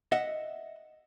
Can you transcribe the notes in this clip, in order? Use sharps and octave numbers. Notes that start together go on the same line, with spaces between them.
D#5 E5 F#5